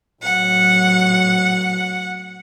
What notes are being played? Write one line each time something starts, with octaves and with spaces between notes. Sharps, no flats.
A2 F#3 F#5